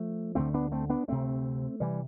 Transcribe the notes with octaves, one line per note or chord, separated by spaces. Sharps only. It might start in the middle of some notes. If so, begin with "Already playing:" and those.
Already playing: F3 A3
D2 D3 A3 C4
B3 D4
A3 C4
B3 D4
D2 C3 A3 C4
C3 E3 G3